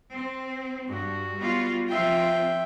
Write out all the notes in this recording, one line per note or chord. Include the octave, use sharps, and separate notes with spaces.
C4
G2 G3 F#4
G3 B3 F4
F3 C4 F4 E5 G5